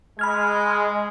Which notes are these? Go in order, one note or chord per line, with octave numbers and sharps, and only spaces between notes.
G#3 B5 F6 G#6